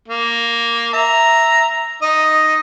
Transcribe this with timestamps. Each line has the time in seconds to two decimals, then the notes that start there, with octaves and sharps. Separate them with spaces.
0.09 A#3
0.94 E5 A#5
2.02 D#4 D#5